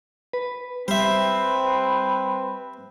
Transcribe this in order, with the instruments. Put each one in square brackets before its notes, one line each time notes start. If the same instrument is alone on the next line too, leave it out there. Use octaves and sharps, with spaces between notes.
[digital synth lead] B4
[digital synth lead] G3 [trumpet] C4 [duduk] B4 [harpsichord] C5 E5